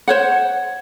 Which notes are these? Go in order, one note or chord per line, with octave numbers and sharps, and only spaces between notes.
C5 C#5 F#5